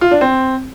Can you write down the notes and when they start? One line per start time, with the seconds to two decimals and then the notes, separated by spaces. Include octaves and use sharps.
0.01 F4
0.11 D4
0.21 C4